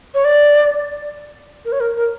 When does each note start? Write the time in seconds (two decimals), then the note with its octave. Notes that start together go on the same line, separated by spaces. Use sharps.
0.15 C#5
0.25 D5
1.65 A#4
1.72 C#5
1.80 A#4
1.97 A#4